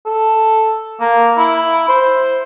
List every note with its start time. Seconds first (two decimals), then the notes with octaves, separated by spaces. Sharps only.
0.06 A4
1.01 A#3
1.37 E4
1.88 C5